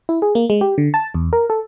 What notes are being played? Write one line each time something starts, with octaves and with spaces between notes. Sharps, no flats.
E4
G#4
A#3
G#3
G4
D3
A5
E2
A#4
A4